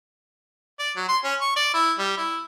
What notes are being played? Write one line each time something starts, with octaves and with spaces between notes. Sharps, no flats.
D5
F#3
C6
C#4
C#6
D5
E4
G3
E4